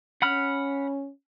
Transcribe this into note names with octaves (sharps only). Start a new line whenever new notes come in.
C#4 F#5 B5 F6